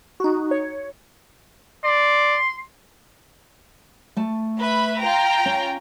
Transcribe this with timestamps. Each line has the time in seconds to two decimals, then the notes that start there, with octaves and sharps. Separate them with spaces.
0.20 D#4 F#4
0.51 C#5
1.84 D5 C6
4.17 A3 A5
4.60 B4 E5 B5
4.99 F4 G5 A#5
5.46 C#4